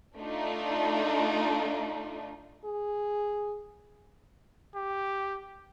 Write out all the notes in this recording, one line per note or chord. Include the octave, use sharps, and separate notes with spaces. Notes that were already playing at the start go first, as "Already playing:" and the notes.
A3 D4 D#4 F4
G#4
G4